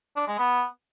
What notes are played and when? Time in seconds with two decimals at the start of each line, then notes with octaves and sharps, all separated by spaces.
0.17 D4
0.28 G#3
0.39 B3